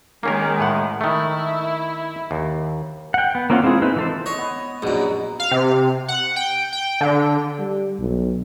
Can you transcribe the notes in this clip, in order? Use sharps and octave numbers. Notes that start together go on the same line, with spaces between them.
D#3 G#3 A#3 C#4 A#4
A2 F#5
D#3 A3 E4
D#2
F#5 G5
B3
A#3 C4 C#4 F4 F#5
G#3 C4 E4 F4 G#4
C4 D#4 B4
E3 A4 C5
C#5 D#5
B3
A#1 F#2 B2 F#3
F5
C3
F#5
G5
G5
D3
G3
B1